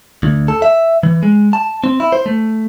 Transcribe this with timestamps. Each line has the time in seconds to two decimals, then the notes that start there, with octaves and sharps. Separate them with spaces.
0.23 D2
0.48 A4
0.62 E5
1.03 E3
1.23 G#3
1.53 A5
1.84 C4
2.00 E4
2.12 C5
2.26 A3